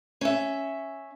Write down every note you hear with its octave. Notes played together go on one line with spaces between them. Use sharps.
C#4 E5